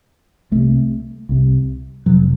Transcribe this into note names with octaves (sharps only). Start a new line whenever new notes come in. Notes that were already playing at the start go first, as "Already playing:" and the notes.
C2 C3 A3
C2 C3
F1 F2 C3 F#3